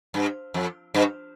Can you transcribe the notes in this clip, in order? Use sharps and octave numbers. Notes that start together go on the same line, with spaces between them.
G2
F2
G2